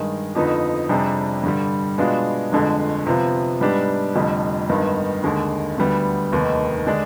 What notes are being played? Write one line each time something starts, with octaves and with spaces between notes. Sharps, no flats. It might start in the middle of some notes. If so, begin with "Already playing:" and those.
Already playing: G2 D#3 G#3
F2 D3 F3 B3 D#4
F2 C3 G3 D4 G#4
G2 D3 G3
B2 G#3 B3 D4 F4
G1 F2 D3 G#3
C3 F3 B3 F4
G#2 G3 B3 D4 G4
F1 F2 D3 G3
G#1 G2 D#3 B3
D#2 D3 G#3
D2 D3 G3 B3
F1 D#2 D#3 B3
D3 G#3 D4